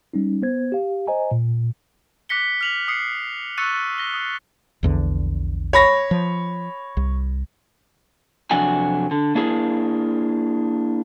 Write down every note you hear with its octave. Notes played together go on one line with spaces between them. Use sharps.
G3 C#4 D#4
B3 C5 G#6
G4 F5
C5 D#5 G#5 A#5
A#2
D6 F#6 A#6 B6 C#7 G7
F6 F7 F#7
D#6 C7 C#7
C#6 E6 F#6 A6 C#7 D#7
A#6 G7
D#6
A#1 E2 D3
C#5 B5 A#6
F3
C2
F2 C3 F#3 D4 F#4 G#5
D3
A#3 D4 E4 G#4 A#4